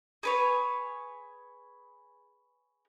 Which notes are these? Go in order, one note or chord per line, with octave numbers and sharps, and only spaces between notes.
G#4 B4 C#5